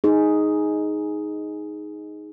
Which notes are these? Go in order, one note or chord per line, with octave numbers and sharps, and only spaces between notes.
D#4 G#4